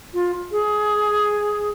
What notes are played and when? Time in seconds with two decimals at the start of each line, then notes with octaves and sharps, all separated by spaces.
0.14 F4
0.52 G#4